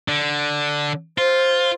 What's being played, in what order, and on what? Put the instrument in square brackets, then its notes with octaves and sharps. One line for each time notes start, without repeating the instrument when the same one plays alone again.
[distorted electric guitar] D3
[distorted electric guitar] F4 [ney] C5